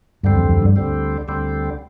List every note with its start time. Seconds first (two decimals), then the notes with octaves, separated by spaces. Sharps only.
0.23 D2 G2 D3 G3 C4
0.37 F2
0.49 F2
0.62 G2
0.76 D2 D3 G3 C4
1.28 D2 D3 G3 C4